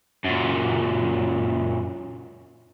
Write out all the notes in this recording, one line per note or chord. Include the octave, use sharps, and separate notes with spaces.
F#2 A#2